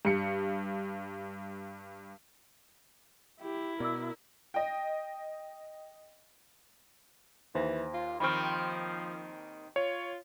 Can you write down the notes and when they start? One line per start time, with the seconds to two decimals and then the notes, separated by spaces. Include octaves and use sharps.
0.05 G2 C#7
3.42 E4 G4
3.80 B2 A#4 D5 D6 E6
4.54 D#5 G5
7.55 D#2 E3 C5 A#6
7.94 F4
8.20 D#3 F3 C4 B5 C#6 F6
9.76 F4 C#5